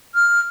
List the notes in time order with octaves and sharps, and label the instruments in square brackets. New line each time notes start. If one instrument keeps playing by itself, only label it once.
[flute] F6